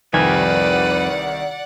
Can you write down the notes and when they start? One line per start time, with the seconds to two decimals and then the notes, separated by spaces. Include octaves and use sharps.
0.14 C2 F2 D#3 G3 B4 D5 F#5 G#5